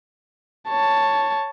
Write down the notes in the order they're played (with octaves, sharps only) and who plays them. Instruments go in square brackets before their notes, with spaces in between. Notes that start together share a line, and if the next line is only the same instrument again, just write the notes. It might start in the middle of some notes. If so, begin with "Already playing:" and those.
[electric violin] C#5 A5